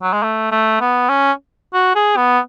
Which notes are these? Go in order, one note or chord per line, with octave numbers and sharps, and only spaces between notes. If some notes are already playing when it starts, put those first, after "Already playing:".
F#3
G#3
A3
A3
B3
C#4
F#4
G#4
B3